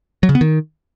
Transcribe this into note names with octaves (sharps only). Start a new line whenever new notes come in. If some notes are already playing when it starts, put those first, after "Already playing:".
F#3
C#3
B3
D#3